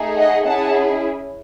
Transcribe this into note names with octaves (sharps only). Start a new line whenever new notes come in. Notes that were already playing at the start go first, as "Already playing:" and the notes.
Already playing: A3 D#4 G#4
D#5 F#5
C#4 E4 G#4 F#5 A5